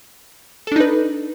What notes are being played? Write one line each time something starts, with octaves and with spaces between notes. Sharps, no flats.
D4 D#4 A4 B4